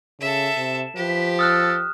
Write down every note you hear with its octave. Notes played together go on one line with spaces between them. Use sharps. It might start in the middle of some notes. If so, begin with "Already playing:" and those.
C#3 A4 E5
C3 E7
F3 G4 B4
A4 D#6 F6 F#6